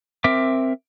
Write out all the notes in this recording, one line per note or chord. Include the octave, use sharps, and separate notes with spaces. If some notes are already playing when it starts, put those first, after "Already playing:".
C4 A#4 E5 D6